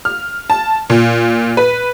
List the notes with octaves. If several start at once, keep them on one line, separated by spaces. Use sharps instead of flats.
F6
A5
A#2
B4